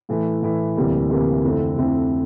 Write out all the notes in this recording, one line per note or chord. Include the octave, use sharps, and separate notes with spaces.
A2 E3 A3 E4
A2 E3 A3 E4
D2 C3 E3 G3 A#3
D2 C3 E3 G3 A#3
F2 D3 A3 C4 E4
F2 D3 A3 C4 E4